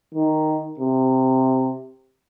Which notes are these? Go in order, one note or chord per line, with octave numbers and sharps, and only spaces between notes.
D#3
C3